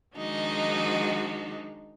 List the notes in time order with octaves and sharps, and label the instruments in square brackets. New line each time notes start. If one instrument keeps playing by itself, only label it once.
[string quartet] D#3 F3 G#3 D4 D#4 F#4